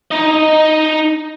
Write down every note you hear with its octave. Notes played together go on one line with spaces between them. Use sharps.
D#4 D#5